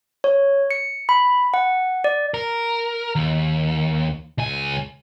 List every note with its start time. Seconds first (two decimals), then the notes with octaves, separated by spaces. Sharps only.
0.24 C#5
0.71 C#7
1.09 B5
1.54 F#5
2.04 D5
2.34 A#4
3.16 D#2
4.38 C#2 G#5